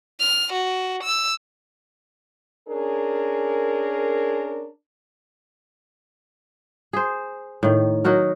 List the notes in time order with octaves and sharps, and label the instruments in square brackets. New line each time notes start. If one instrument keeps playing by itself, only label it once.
[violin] F6
F#4
E6
[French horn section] C#4 D4 G#4 A#4
[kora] G#4 C5
A2 D#3
F#3 D#4 F#4 A#4